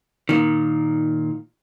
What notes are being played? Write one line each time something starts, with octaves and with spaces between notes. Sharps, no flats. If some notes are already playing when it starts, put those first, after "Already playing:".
A#2 D#3